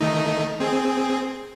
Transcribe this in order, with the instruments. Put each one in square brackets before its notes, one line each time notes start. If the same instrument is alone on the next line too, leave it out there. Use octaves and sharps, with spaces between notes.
[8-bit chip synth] D#3 A3 D#4
C4 G#4